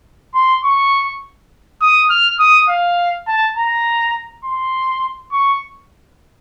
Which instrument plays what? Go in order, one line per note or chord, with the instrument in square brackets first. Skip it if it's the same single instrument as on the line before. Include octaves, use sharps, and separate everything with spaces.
[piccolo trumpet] C6
C#6
D#6
F6
D#6
F5
A5
A#5
C6
C#6